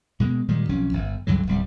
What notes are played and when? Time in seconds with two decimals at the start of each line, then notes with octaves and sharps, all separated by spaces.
0.20 B2 G#3 A#3
0.49 A#2 D#3 G3 G#3
0.69 B1 F2 C#4
0.93 G1
1.27 C#2 G2 D3 F#3
1.47 D1 C2 G3